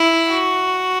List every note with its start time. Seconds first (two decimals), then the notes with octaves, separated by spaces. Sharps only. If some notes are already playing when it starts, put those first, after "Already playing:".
Already playing: E4
0.29 F#4